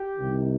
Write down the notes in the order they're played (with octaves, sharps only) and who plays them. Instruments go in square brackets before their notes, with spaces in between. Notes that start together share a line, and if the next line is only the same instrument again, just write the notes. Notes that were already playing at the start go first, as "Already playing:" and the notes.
Already playing: [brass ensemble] G4
C2 C3 D#3